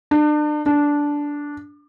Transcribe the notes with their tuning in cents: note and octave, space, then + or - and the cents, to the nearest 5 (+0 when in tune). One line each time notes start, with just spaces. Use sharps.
D4 +35
D4 -10